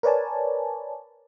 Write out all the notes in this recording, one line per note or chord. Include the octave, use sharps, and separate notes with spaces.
A#4 B4 C#5 D5 G#5 A5